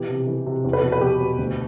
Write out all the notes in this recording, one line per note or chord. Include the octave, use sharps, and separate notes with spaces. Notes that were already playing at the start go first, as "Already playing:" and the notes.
Already playing: B2 E3 G4
C3
E3
C3
E2
B4
B2
B4
B2 G4
B2
D2